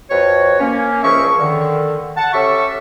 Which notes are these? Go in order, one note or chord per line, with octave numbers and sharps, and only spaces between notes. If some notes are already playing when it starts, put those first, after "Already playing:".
F2 F#4 B4 C#5
A#3 C#4
C#2 F3 G#4 A#4 E5 C#6
D3 D#3
F#5 A5
C#4 G4 A4 E5 C#6